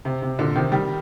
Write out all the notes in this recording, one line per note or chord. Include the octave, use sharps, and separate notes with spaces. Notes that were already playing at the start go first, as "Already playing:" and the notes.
C3
C3
A#2 D3
C3 D#3
D#3 G3